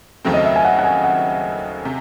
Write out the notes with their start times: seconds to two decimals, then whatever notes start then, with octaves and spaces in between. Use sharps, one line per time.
0.25 D#2 C#3 F#3 A3 C4
0.34 D#5
0.45 E5
0.56 G#5
0.65 F#5
0.79 F#5
0.84 G#5
1.04 F#5
1.85 C3